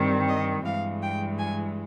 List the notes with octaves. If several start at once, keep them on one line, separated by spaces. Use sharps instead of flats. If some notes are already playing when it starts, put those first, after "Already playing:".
Already playing: G2 D#3 G3 C4
D#5
G2 E3 G#3 F5
G5
G#5